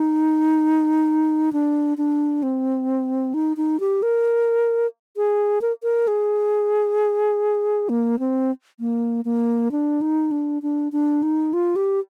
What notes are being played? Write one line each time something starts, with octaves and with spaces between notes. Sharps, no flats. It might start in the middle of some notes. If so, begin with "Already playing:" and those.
Already playing: D#4
D4
D4
C4
D#4
D#4
G4
A#4
G#4
A#4
A#4
G#4
A#3
C4
A#3
A#3
D4
D#4
D4
D4
D4
D#4
F4
G4